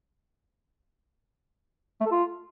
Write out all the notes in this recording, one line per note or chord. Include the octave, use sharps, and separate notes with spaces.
A3
A4
F4